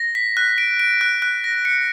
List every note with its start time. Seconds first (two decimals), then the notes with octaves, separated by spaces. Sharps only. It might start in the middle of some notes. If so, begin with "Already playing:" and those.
Already playing: A#6
0.15 B6
0.37 F#6
0.58 D7
0.80 D7
1.01 F#6
1.22 F#6
1.44 A#6
1.65 C#7